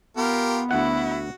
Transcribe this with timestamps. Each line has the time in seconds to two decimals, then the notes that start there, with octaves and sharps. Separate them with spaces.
0.17 B3 F4 G4 A#4
0.71 D2 E4 F#4 F#5